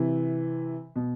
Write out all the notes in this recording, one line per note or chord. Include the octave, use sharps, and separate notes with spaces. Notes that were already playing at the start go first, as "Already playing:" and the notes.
Already playing: C3 E3
B2